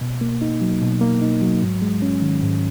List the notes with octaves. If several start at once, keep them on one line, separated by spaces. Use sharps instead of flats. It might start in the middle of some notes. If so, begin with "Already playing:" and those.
B2
A#3
D#4
F#3
B2
A#3
D#4
F#3
G#2
G#3
C#4
D#3
G#2